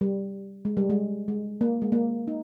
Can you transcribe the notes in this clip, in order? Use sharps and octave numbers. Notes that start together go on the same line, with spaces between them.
G3
G#3
G3
G#3
G#3
A#3
G#3
A#3
D#4